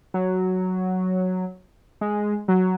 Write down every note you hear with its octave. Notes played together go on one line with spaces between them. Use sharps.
F#3
G#3
F#3